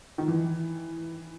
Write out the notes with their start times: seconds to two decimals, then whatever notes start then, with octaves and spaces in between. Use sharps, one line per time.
0.18 D#3
0.28 E3